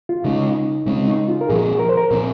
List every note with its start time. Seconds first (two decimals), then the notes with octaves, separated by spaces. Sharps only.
0.09 F4
0.24 C#3 G#3 C#4 D#4
0.86 C#3 G#3 C4 C#4
1.08 D#4
1.28 F4
1.41 A#4
1.49 A#2 F3 C4 G#4
1.79 A#4
1.89 C5
1.97 A#4
2.11 A#2 F3 C4